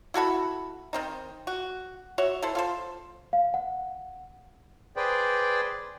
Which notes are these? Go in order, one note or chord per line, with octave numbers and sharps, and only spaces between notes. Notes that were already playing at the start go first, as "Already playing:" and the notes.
E4 F#4 A4 B5
D#3 C4 D#4
F#4
F#4 C#5 E5
E4 A4 C5
F4 A4 C5
F5
F#5
G#4 B4 C5 D5 G5